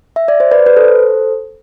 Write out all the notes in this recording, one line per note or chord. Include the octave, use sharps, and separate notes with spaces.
E5
D5
C5
B4 D5
B4
A4 C5